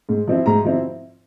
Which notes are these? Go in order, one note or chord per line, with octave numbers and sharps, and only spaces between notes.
G#2
F3 C4 E4
G#2 A#5
F3 C4 E4